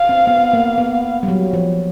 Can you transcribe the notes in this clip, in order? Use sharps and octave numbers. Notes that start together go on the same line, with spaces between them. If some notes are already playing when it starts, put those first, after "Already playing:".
Already playing: F5
C4
B3
A#3
B3
G3
F#3
F3